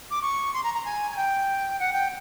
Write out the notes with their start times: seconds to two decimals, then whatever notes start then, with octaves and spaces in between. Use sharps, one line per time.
0.11 D6
0.22 C#6
0.54 C6
0.64 A#5
0.74 A#5
0.85 G#5
1.11 G#5
1.17 G5
1.80 F#5
1.93 G5